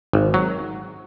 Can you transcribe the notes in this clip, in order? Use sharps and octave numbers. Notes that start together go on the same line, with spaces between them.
G#1
F#3